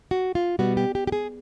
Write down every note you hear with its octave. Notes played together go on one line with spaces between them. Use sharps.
F#4
F4
B2 G3 B3 F#4
G4
G4
G4
G#4